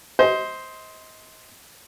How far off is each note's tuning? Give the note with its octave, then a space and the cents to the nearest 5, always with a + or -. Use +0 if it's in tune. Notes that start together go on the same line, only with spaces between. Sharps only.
C5 +0 D#5 +30